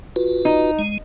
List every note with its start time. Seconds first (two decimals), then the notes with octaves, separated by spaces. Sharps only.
0.16 F4 F#4 B4
0.45 D#4
0.79 G#3